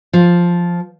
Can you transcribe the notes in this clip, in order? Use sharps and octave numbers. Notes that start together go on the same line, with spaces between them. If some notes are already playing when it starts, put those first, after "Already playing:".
F3